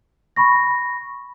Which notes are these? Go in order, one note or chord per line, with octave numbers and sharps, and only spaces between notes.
B5 C#6 A#6